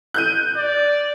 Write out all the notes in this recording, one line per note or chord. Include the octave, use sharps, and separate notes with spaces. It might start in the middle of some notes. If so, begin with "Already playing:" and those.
F#6 G6 D#7
D5